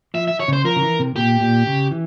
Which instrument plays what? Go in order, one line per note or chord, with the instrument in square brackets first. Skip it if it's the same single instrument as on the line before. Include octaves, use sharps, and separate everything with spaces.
[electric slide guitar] F3 [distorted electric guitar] E5
[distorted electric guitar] E5
C#5
[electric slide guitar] C#3 [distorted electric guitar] C5
[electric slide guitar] F3 [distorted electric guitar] A#4
[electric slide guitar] C#3
E3
C3
[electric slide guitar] A#2 [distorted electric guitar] G4
[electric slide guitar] A#2
C#3
E3